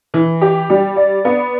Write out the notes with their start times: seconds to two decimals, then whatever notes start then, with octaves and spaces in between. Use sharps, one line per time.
0.14 E3
0.41 G4
0.70 G3
0.96 D5
1.25 B3